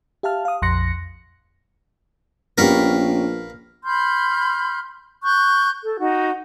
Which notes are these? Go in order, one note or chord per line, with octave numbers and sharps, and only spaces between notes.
G4 E5 F5 A5 F6
F5 D#6
A#1 F2 C6 F#6 A#6 C#7
A#1 B3 C#4 G4 A#4 B4 F5
B5 C6 F6 G6
C#6 F#6 G6
A4
D#4 F#4